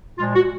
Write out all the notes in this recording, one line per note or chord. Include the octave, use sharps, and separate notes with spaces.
A#2 F3 G#3 F4
F#4